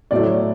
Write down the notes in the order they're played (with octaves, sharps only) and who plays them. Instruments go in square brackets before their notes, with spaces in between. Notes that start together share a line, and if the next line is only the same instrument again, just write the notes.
[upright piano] A2 F#3 A3 D5